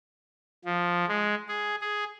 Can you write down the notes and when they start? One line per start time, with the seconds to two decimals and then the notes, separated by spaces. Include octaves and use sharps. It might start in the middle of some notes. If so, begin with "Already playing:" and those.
0.65 F3
1.08 G#3
1.48 G#4
1.81 G#4